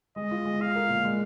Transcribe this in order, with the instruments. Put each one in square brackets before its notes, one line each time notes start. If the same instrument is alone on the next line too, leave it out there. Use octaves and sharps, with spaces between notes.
[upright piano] G#3 [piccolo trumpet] D#5
[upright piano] F4
G#3
[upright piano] F4 [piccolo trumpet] F5
[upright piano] A#4
A#2
G#3